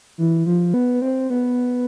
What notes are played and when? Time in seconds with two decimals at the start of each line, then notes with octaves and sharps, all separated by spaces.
0.18 E3
0.46 F3
0.74 B3
1.02 C4
1.30 B3